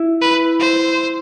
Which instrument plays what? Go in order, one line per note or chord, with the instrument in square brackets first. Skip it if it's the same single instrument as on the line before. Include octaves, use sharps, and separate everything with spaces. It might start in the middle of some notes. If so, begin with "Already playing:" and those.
Already playing: [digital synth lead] E4
[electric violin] B4
C5